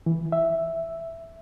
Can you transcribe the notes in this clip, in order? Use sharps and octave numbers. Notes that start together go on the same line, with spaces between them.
E3
E5